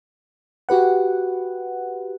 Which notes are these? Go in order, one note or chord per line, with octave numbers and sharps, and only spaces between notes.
F#4 G4 B4 F#5